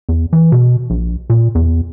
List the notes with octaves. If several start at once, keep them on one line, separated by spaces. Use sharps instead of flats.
E2
E3
B2
A#1
A#2
E2